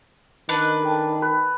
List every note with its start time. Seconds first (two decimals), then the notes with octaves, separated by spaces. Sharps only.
0.49 D#3 D4 B4 D#5 B5
0.83 A4 G5 A5
1.22 B4